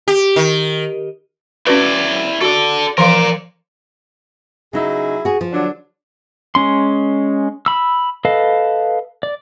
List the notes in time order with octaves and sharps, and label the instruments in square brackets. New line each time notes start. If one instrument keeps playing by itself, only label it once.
[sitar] G4
D#3
[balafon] C#4 F#4 B4 [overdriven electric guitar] E4 D5
[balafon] F#4 [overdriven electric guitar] A4 D5
[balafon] E3 F3 F5 [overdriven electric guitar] A#4 D5
[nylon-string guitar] C#3 D#4 [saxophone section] F#3 E4 G#4
[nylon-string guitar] F#4 G#4
F3
[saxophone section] D3 F#3 D4
[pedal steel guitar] G#3 C#4 C6
B5 E6
A4 B4 D#5 F5
D5